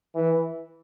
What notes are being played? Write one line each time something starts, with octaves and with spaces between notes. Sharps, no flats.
E3